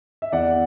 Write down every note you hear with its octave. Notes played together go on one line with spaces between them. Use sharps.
E5
E2 D5 F#5